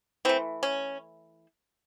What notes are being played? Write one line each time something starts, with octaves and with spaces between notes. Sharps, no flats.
E3 A3 C4
C#4